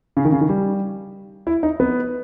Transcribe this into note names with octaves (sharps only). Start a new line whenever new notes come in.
C#3
D#3
C#3
D#3
G3
E4
D#4
B3